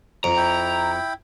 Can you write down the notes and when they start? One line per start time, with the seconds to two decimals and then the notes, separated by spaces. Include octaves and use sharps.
0.24 F2 A#5
0.37 E4 G5